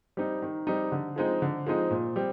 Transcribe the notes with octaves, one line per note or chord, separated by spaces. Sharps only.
G3 C4 D#4
D#3
G3 C4 D#4
D3
F3 G#3 C4 D#4
D3
F3 G#3 C4 D#4
A#2
G3 C4